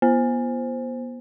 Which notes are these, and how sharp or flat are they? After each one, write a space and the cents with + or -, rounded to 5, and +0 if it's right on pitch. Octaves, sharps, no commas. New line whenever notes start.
B3 -35 C5 +0